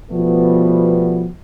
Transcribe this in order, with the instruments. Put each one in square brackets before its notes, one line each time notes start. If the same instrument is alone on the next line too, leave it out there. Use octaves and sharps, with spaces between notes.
[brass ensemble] B2 F3 G3 A3 B3